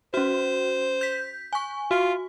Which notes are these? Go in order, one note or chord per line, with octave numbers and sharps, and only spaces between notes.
C#4 F#4 C5
G6 B6
G#5 C#6
F4 F#4